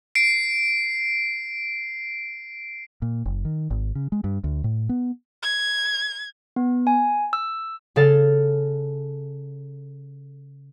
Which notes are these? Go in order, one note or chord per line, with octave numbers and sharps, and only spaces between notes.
C7 D7
A#2
F#1
D#3
G#1
C#3
G#3
G2
D2
A2
B3
G#6
B3
G#5
E6
C#3 A4 F5 A6